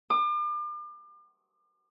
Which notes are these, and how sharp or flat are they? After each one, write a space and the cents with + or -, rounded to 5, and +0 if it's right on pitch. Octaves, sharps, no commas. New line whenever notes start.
D6 +40